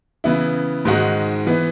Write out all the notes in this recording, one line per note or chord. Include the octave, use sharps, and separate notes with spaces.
C#3 E3 B3 E4
G#2 D#3 G#3 D#4 F#4
E3 B3